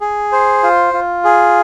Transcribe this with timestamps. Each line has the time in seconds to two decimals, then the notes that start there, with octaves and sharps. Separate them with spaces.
0.01 G#4
0.32 C5
0.63 F4
0.93 F4
1.25 G#4